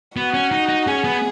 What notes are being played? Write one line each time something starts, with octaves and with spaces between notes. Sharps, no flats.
B3 F#4
C#4
D#4
D#4
C#4 G#4
B3